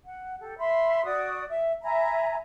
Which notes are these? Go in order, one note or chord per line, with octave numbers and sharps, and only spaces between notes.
F#5
G4 A4
E5 B5 C6
F#4 D5 D#6
E5
E5 G#5 A#5 B5